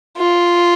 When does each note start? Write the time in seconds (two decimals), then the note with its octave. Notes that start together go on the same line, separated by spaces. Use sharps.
0.18 F4